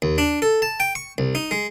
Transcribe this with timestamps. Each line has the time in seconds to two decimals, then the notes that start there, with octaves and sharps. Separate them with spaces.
0.02 D#2
0.18 D4
0.42 A4
0.62 A5
0.80 G5
0.95 C#6
1.18 C2
1.35 D#4
1.51 G#3